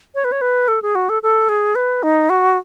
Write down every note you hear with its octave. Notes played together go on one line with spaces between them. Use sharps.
C#5
B4
C#5
B4
A4
G#4
F#4
A4
A4
G#4
B4
D#4
F#4